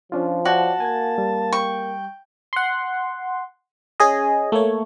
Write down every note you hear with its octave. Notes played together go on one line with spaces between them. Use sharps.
F3 C#4 D4 F4
F#4 C#5 D5 G5 A5
A#3 G#5 G#6
G3
G5 C#6
F#5 C6
C#4 G#4 D#5
A3 A#3 C#5